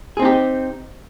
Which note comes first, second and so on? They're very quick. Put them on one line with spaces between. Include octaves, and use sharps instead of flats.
G#4 C4 D#4 G4